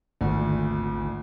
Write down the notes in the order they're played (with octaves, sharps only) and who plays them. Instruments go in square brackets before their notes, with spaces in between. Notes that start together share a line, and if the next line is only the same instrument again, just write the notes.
[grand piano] D#1 D2 [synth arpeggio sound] G#1